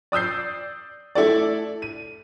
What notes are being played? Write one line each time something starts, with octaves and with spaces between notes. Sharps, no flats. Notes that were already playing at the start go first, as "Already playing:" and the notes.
D5 D#6 E6 G6 C7
A3 E4 A4 D5
D#7